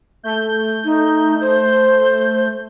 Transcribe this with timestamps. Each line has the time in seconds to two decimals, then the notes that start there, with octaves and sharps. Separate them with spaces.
0.23 A3 G6
0.84 D#4
1.41 C5